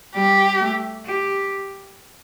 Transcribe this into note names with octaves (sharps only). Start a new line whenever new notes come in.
G3 G4
A3
G4